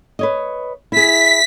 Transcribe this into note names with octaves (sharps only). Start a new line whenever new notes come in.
B4 C#5 D#5
E4 G#4 B6